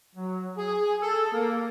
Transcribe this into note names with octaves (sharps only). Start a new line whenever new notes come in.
F#3
G#4
A4
A#3